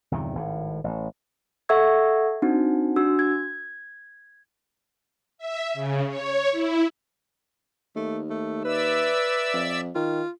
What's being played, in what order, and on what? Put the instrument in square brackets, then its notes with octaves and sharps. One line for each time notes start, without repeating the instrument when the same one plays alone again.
[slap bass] G1 E2 C3 D#3
G#1 A2
A1
[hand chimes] A4 E5 F#5 C#6 E6 G#6
C4 D4 D#4 F#4
D4 F#4 E6
G#6
[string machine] E5
C#3
C#5
E4
[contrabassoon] D#2 [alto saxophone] A3
[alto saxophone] A3
[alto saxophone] B4 [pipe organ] D5 E5 E6
[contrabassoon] F2
[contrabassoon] D#3 [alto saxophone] F4